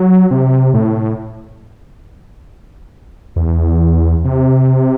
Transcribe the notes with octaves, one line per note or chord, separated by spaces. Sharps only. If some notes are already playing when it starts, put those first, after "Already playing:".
Already playing: F#3
C3
A2
E2
C3